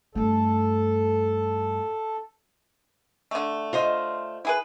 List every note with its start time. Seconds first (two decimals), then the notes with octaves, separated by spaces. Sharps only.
0.15 G2 A3 A4
3.31 D3 A3
3.73 F4 C5 D#5
4.45 E4 G#4 B4